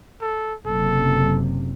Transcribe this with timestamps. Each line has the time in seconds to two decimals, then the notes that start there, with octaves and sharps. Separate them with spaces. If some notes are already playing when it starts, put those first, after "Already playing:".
0.21 A4
0.66 F#1 C3 A4